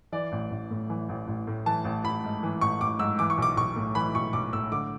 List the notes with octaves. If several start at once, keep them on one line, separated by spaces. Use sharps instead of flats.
E3 D5
A1
A1
A2
E3
A1
A1
A2
E3 A5
A1
A1 B5
G#2
E3
A1 C#6
A1 D6
G#2 E6
E3 D6
C#6
B1 D6
B1 C#6
A2
E3 B5
B1 C#6
B1 D6
A2 E6
D3 D6